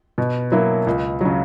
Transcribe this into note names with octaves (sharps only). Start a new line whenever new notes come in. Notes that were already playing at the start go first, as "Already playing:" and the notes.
B2
F#3 A#3 E4
C#2
C#3 F#3